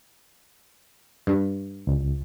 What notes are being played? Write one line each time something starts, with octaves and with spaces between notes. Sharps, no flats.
G2
C#2